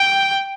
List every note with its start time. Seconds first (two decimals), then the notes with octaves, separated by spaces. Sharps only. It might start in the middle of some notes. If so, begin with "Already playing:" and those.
Already playing: G5